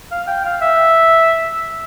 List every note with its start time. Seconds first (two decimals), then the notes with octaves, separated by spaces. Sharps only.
0.11 F5
0.27 G5
0.44 F5
0.61 E5